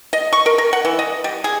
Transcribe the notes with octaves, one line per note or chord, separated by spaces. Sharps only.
D#5
C#6
A#4
A#4
F#5
E3
D#5
G3
G#4